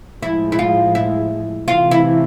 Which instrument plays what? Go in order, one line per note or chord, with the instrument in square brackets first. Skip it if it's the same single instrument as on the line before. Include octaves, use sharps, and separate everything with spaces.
[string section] A2 F3 G#3 [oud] E4
[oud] E4
F4
E4
[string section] C3 E3 A3 [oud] F4
[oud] E4